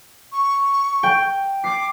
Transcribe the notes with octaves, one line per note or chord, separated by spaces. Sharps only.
C#6
G5
D6 C7